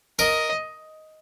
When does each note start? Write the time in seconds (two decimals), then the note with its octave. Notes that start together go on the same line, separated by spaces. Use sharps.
0.19 A#4 D#5